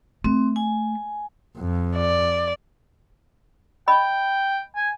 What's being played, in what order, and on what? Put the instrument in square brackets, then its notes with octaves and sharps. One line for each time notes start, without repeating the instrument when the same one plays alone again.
[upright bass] A3 [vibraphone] C4
[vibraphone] G#5
[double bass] F2
[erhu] D5
[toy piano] D#5 B5 [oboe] G5
[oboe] G#5